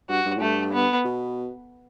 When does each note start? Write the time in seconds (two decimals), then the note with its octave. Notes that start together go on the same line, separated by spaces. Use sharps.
0.09 G2 F#4
0.25 G2
0.36 A2
0.41 G2 A3
0.73 B3
1.05 B2